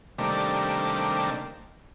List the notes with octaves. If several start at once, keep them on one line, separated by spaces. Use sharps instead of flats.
C3 D#3 G3 A3 A#3 D4